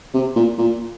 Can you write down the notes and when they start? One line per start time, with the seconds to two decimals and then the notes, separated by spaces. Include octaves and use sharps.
0.14 C3
0.36 A#2
0.58 A#2